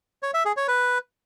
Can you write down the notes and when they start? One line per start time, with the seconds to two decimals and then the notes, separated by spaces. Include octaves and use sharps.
0.23 C#5
0.34 E5
0.45 G#4
0.57 C#5
0.68 B4